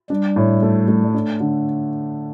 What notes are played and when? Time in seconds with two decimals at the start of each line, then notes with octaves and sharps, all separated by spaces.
0.10 G3 D4
0.36 A2
0.62 A3
0.88 A3
1.14 D4
1.40 D3